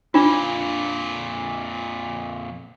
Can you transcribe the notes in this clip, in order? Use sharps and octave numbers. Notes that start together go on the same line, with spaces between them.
F2 A#2 D4 F4